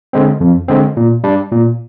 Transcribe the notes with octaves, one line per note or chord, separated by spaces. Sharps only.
D3 G#3 C4
F2
D3 G#3 C4
A#2
G3 D4
A#2